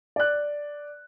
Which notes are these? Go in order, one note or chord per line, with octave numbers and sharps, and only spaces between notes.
D5 F#6